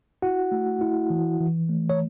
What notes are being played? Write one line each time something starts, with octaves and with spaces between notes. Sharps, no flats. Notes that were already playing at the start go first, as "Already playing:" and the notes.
E4 F#4 F#5
A3
E4
E3
E3
A3
C#5